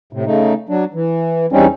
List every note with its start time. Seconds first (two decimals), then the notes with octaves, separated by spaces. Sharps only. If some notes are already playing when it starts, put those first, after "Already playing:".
0.13 A2 C3
0.26 C#3 A3 D#4
0.69 F#3 D4
0.94 E3
1.52 E2 G3 C4 C#4 D#4